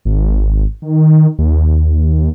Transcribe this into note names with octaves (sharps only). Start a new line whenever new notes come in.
G#1
D#3
D#2